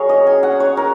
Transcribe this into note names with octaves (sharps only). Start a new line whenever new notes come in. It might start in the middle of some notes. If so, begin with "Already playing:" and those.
Already playing: F#3 C#4 G#4 A#4 C#5 F#5
D#5
G#5
F#5
C#5
A#4